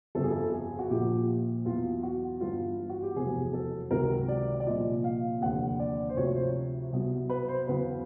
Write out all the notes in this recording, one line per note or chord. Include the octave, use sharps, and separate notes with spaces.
G1 F2 C#3 A4
G#4
A4
G#4
F#4
A#1 A#2 F3 G4
E2 B2 F#3 F4
F#4
G1 G2 E3 F4
F#4
G4
F1 E2 B2 F#3 G#4
A4
C#2 C3 D#3 F#3 A#4
D5
D5
C2 A#2 F3 D#5
F5
F1 D#2 D3 F#5
D5
C5
D2 C3 F3 C#5
C5
C2 B2 F#3
B4
C5
E2 C#3 F#3 B4